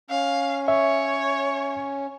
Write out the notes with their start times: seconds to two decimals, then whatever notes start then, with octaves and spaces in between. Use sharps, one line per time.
0.10 C#4 F5
0.68 C#5 E5